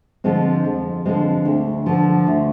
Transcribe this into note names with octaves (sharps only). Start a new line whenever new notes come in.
D3 F3 G#3 C4
F2
D3 F3 G#3 C4
D2
D3 F3
D2